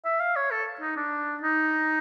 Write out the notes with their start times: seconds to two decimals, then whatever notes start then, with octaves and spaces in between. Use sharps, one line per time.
0.05 E5
0.20 F5
0.36 C#5
0.51 A4
0.81 D#4
0.97 D4
1.43 D#4